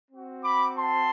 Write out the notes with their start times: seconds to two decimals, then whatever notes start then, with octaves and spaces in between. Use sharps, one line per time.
0.11 C4 F#4
0.43 B5 D6
0.75 A5 C6